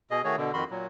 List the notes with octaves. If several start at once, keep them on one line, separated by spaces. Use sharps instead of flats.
B2 G#4 D#5
D#3 A3 F#4 G#4 C#5
B2 D3
F2 D#3 F#4 B5 C6
A#2 F#3